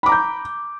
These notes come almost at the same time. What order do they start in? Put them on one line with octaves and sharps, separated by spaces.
B5 D6 A#5 G6